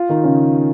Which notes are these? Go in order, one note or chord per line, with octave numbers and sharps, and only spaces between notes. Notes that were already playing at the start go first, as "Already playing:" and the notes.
Already playing: F4
D#3 D#4
C#3 C#4